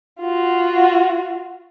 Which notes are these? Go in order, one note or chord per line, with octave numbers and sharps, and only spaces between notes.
F4 F#4